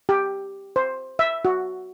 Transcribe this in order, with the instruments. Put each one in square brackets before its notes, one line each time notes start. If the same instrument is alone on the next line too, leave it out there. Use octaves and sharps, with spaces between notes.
[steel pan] G4
C5
E5
F#4